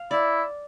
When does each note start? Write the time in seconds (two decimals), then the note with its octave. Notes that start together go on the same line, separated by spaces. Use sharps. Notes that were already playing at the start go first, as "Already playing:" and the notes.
Already playing: F5
0.11 E4 D5